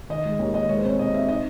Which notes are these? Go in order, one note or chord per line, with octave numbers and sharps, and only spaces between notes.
D#3 D#5
G#3
D#2 C#5
D#2 D#5
G#3 C#5
C5
C4 C#5
C3 D#5
C4 E5
D#4 D#5